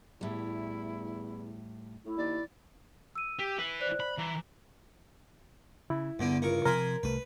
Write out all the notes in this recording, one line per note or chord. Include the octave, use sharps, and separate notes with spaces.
E2 A2 G3 E4
A2 E4
D#2 D5
E6 D#7
G4
E4 B4
C5 D5 F#6
B5
E3 A#5
C#3 E4
E2 G2 D3 D4
C#2 A#4 C#6
C3 F3 A#4 C5 G#5 B5
C2 A3 B4